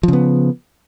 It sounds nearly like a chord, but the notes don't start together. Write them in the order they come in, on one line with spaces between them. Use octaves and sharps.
F3 C#3 B3